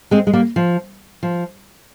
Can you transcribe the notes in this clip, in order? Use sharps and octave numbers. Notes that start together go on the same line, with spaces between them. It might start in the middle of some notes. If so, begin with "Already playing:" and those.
G#3 C4
G#3
G3 A#3
F3
F3